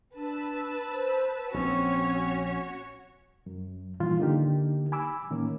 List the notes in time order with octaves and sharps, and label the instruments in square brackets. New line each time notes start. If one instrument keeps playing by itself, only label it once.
[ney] D4 [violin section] B4 A5 E6
[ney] C5
[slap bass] A#1 [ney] C4 [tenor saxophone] C#4 [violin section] F#4 C#5
[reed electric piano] F#2
G2 A#2 D#3 E3 F4
D3 A#3 D#4 G4
G#5 B5 D6 E6
A2 D#3 A#3 C#4